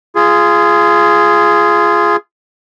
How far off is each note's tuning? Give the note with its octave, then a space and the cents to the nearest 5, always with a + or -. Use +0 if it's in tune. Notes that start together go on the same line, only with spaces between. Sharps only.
F4 -25 G#4 +0